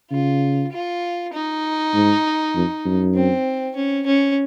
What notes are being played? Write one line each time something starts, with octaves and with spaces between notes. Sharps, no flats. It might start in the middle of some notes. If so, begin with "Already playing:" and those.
C#3 F4
F4
D#4
G#2
F2
F#2
C4
C#4
C#4